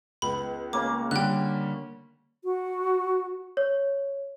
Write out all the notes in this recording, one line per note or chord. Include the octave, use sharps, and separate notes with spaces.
C#2 B3 B5
C#3 A#3 D6
D3 G3 G5 F#6
F#4
C#5